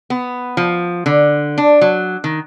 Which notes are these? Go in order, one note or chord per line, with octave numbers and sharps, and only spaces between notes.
B3
F3
D3
D4
F#3
D#3